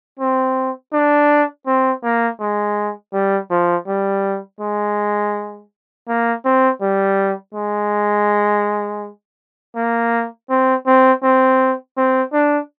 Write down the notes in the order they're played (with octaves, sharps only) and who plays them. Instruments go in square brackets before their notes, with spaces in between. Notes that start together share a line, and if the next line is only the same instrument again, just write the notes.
[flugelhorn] C4
D4
C4
A#3
G#3
G3
F3
G3
G#3
A#3
C4
G3
G#3
A#3
C4
C4
C4
C4
D4